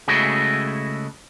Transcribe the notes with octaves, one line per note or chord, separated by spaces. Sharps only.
C#3 G#3 A3 E4 F#4 G#4